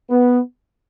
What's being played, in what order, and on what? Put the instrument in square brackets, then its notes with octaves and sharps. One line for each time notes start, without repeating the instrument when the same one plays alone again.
[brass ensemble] B3